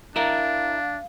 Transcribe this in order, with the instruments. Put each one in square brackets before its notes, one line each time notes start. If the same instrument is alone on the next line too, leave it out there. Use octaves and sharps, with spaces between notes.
[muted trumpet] D4 [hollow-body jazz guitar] E4 A#4 [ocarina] F5